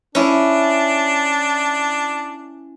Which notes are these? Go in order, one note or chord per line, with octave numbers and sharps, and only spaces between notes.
C#4 D4 E4